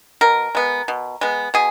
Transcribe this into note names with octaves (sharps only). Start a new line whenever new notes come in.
B2 A#4
G#3 B3
B2
G#3 B3
B2 G#4